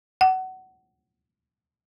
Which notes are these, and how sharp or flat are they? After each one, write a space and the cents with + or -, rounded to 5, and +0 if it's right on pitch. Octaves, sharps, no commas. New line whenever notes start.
F#5 +25